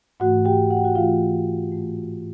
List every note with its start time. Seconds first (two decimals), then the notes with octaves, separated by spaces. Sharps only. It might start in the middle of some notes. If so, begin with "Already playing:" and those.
0.20 G#2 E3 A3 F#4 F#5
0.45 G4 G5
0.70 F#5
0.77 G5
0.84 F#4 F#5
0.95 G#2 E3 A3 F4 F5
1.70 A2 E3 A3